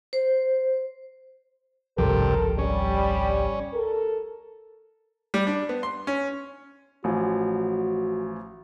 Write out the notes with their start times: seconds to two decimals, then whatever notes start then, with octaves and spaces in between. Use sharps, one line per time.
0.13 C5
1.98 G#1 C#2 G2 C3 F3 G4 A4 A#4
2.58 G3 C#4
3.74 A4 A#4
5.34 G3
5.47 D4
5.69 B3
5.83 C6
6.07 C#4
7.04 A1 F3 F#4 G#5